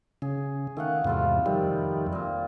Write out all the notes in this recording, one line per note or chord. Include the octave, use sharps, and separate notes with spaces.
C#3 G#4
D#3 A3 F5 F#5
E2 G#2 C3 G3 F4 A4
F2 C3 D#3 G3
A#2 C4